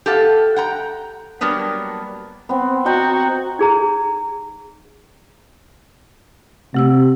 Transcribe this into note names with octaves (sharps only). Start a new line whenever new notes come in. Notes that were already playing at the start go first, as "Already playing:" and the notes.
G4 A4 F5 F#5
F#5 G5 A#5
F#3 G3 A#3 B3 D4
B3 C4
F#4 D#5 G5 A#5
D#4 G#4 A#5
C3 A3 G4 E6